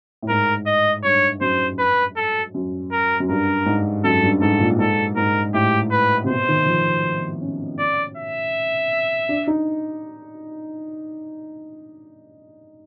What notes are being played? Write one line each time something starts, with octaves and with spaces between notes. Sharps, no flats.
A2
G#2 A#4
D#5
G2 C#5
F#2 C5
B4
A4
F#2
A#4
F#2
G2 A#4
G#2
F#2 A4
G2
G#2 A4
A#2
G#2 A4
G#2 A#4
A2 G4
B4
C3
B2 C5
D#3
F3
C#4
D5
E5
D4
D#4